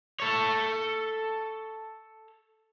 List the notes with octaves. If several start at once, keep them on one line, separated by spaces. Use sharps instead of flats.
A4 C#5